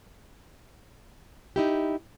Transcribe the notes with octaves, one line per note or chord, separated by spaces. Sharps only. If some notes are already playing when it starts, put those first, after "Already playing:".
D#4 E4 G4